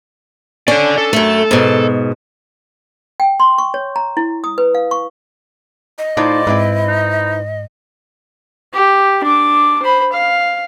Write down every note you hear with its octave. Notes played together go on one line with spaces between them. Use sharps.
C#4 D4 A4 D5
A4
F#2 A3
G#2 B2
G5
C6
C#6
C#5
A#5
E4
D#6
B4
F5
C#6
D#5
A2 D#4 F4 C5 D5
G#2 C4 E4 B4
D#4
G4
D4 D6
C5 B5
F5